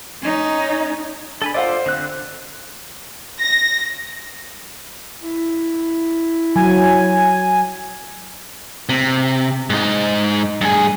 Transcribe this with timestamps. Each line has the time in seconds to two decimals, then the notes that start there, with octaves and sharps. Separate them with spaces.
0.22 C#4 D#4
1.42 D4 A4 G#5 B5
1.54 F4 A4 C5 D5 D#5 F5 F#5
1.86 D3 C4 F#6
3.41 A#6
5.21 E4
6.56 F#3 G#5
8.89 C3
9.70 G#2 D#4
10.61 G2 G#4